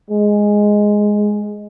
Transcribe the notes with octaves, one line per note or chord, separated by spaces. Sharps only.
G#3